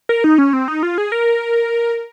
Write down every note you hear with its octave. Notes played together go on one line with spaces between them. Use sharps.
A#4
D#4
C#4
C4
D#4
F4
G#4
A#4